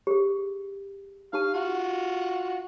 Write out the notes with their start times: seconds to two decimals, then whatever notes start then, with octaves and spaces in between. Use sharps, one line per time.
0.07 G4 G#4
1.33 D#4 G4 F5 A5
1.54 F4 F#4